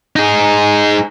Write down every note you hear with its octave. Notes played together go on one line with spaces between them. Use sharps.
D#4 G#4